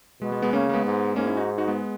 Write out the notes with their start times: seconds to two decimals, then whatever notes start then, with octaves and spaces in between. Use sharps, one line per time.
0.22 B2 G#3
0.32 G#3
0.42 G#3 B3
0.53 C#3 A#3 C#4
0.69 A#3
0.73 G#3 B3
0.85 G#2
1.16 G#2 A#3 C#4
1.26 C#4 E4
1.37 D#4 F#4
1.58 D#4 F#4
1.68 G#3 B3